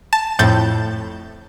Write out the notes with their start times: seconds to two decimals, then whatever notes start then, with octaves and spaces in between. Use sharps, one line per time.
0.13 A5
0.39 F2 A2 G6 A6